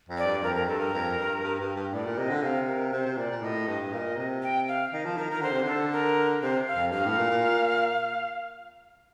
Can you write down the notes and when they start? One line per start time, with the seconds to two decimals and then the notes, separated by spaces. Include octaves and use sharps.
0.09 F2
0.18 D5
0.26 G2
0.42 F2 A#4
0.55 A#4
0.68 G2 A4
0.80 A#4
0.93 F2
1.18 G2
1.43 G2
1.60 G2
1.76 G2
1.93 A2 D5
2.06 A#2
2.17 C3 D#5
2.30 D3
2.43 C3 F5
2.67 A#4
2.93 C3 C5
3.06 C3
3.18 A#2 D5
3.30 A#2
3.42 A2 D#5
3.67 G2
3.93 A#2 F5
3.98 D#5
4.17 C3
4.43 G5
4.68 F5
4.93 D#3 D#5
5.06 F3
5.17 D#3 A#4
5.31 D#3 A#4
5.40 D3 C5
5.51 C3
5.63 D3
5.68 A4
5.93 A#4
6.43 C3 C5
6.68 F5
6.75 F2
6.92 G2 F5
7.06 A2
7.18 A#2
7.30 A#2